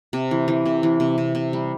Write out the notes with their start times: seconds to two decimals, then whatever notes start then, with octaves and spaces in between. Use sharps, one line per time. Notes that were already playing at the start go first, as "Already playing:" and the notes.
0.13 C3
0.31 E3
0.48 E3
0.66 C3
0.83 E3
1.00 C3
1.18 C3
1.35 C3
1.53 G3